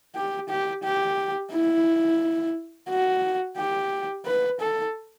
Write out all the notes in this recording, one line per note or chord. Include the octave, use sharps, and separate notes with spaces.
G4
G4
G4
E4
F#4
G4
B4
A4